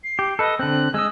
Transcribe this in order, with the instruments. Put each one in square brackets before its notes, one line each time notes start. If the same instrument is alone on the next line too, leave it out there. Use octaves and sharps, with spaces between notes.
[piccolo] C7
[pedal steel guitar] G4
[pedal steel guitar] A4 B4 [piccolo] D#5
[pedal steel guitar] D3 C4 [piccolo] F#6
[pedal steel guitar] G#3 D#5 [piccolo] E6